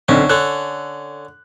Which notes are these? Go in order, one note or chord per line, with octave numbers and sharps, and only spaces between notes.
B1 D3 C4 C#4
D3 C#4 A4 F#6